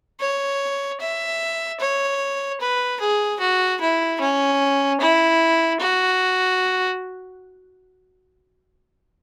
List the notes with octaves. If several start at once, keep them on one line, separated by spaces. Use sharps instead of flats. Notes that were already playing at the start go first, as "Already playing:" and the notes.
C#5
E5
C#5
B4
G#4
F#4
E4
C#4
E4
F#4